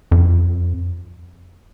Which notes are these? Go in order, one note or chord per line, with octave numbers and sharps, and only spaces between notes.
F2